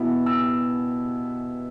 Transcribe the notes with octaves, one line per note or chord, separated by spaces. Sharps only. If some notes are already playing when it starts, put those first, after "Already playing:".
Already playing: B2 B3 E4
E6